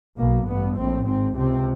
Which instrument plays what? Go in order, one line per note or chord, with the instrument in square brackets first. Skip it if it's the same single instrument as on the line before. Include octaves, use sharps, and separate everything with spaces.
[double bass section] B1 B2 A#3
A1 G2 B3
A#1 A2 C4
G#1 G#2 C4
C#2 C3 C4